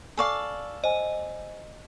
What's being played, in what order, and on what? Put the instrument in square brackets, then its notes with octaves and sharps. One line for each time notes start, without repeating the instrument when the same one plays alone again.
[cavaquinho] A4 D5 F5 [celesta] G#5 C#6
[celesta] C5 G#5 [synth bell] D#5